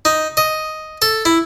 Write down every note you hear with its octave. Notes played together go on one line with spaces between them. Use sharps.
D#4
D#5
A4
E4